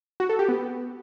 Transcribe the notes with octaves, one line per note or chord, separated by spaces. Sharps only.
F#4
A4
G4
B3